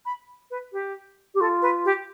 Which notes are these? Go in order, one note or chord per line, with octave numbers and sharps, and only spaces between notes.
B5
B4
G4
G4
F4 A4
B4
G4